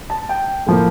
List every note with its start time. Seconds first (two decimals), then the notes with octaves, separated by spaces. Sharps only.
0.10 A5
0.29 G5
0.67 A2 F3 A#3